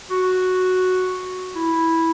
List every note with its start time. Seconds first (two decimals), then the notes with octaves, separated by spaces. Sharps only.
0.11 F#4
1.56 E4